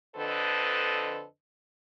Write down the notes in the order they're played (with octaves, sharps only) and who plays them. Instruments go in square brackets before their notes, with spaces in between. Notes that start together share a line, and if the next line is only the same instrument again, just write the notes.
[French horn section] F2 D3 A4 B4 C5 D#5